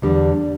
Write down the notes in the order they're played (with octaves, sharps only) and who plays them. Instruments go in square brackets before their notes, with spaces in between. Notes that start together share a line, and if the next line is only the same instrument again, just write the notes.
[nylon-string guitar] E2 D3 G3 D4